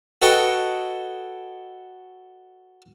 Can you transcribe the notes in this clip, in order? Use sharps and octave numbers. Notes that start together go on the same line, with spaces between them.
F#4 A4 B4 C#5 D#5 G5